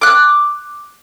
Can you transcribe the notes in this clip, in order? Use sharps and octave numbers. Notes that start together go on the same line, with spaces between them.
D6 F#6